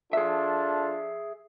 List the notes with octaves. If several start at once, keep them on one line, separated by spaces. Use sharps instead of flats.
D4 F4 G#4 A4 E5